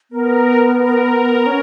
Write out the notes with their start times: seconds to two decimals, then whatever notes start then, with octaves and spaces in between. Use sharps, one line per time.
0.11 B3 A#4
0.79 A#4
1.46 C#4